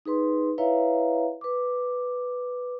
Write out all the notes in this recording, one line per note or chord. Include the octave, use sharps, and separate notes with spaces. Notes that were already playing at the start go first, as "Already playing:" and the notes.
D#4 G#4 B4 C6
E4 B4 C#5 E5 F5 A#5
B4 D6